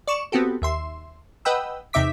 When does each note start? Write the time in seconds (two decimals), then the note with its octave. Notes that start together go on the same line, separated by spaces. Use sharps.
0.07 D5 C#6 E7
0.32 B3 C4 F#4 G4 A4
0.62 D#2 E5 C6
1.45 B4 D#5 F#5 G5 B5 E6
1.93 E2 C3 D#4 E5 D6 B6